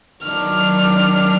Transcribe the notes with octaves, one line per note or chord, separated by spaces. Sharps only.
D#3 F#3 D4 F6